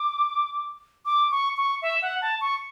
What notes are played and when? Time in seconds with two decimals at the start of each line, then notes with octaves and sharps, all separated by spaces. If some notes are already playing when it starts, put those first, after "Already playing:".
Already playing: D6
1.05 D6
1.31 C#6
1.57 C#6
1.82 E5
2.02 F#5
2.22 A5
2.41 C#6